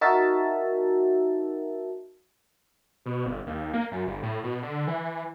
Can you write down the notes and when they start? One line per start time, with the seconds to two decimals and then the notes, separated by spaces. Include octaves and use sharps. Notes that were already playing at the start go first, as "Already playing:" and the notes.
0.01 D#4 F#4 A#4 E5 A5
3.06 B2
3.26 G1
3.47 D#2
3.73 A#3
3.92 F#2
4.07 G1
4.23 A2
4.44 B2
4.62 D3
4.87 E3